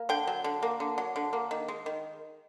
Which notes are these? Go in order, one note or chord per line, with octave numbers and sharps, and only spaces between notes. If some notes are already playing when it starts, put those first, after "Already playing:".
Already playing: A#3
D3 G5
F#3
D3
A#3
D3
F#3
D3
A#3
D#3
G#3
D#3